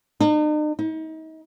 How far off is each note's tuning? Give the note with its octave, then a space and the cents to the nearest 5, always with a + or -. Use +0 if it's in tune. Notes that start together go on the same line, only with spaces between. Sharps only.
D#4 -45
D#4 +35